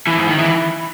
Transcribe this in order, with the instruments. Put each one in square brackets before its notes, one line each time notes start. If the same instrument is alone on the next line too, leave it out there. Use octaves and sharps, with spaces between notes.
[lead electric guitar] E3
G#2
D#3
E3